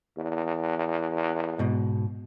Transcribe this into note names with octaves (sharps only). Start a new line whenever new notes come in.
E2
G#2 B2